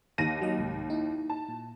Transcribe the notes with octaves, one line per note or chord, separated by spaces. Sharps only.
D#2 A#6 D#7
F#3 D#5
C2 G#2
D#4 E4
A5
A#2